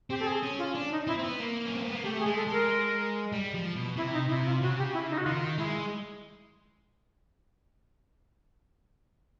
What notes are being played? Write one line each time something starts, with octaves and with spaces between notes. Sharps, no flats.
C4 G4
A4
G#4
C#4
F4
D4
D#4
C4 E4
C4
B3
A#3
C#4
C4
B3
A#3
A3 G4
G#4
G#3
A4
G#3
A#4
G3
F3
B2
C3 E4
D#4
C3 E4
F4
C#3 F#4
G4
E4
D#4
F#4
D#3 F4
G#3 E4